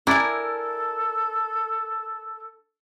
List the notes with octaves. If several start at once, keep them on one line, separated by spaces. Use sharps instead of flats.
D4 E4 A4 A#4 G#5